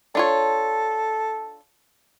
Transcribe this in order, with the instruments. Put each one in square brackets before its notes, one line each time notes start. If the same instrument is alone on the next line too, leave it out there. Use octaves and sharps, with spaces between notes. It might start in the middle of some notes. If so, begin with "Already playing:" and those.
[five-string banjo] D4 F4 C#5 [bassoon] A4